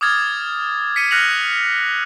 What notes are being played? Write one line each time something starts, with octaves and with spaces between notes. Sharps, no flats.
D6 D#6 F6 G#6 A6
B6 C#7 D#7
F6 F#6 A#6 C#7 F7 F#7